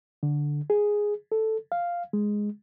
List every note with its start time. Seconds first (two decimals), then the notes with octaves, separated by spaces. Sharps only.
0.23 D3
0.70 G#4
1.32 A4
1.72 F5
2.13 G#3